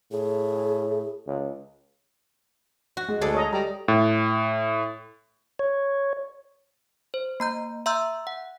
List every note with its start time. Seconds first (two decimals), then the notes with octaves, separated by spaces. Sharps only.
0.12 A2 G#4
1.27 C#2
2.97 F#4
3.08 G#3
3.21 D2 G#4 A4 D5
3.35 C#5 D#5 A#5
3.53 G3 A#5
3.88 A2
5.59 C#5
7.14 C5
7.40 A#3 A#5 G6
7.86 E5 A#5 C6 E6 G6
8.27 F#5